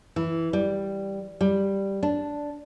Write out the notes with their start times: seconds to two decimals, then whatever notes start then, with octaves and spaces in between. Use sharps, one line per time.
0.16 E3
0.53 G3
1.41 G3
2.03 D4